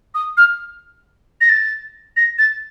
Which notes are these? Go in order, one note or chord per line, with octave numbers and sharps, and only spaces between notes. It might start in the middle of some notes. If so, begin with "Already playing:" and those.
D#6
F6
A#6
A6
A#6
A6